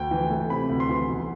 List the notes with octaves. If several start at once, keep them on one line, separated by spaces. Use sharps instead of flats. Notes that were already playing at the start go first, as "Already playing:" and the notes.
Already playing: D2 G5
E3
A3
C3 B5
D2
C6
E3
B1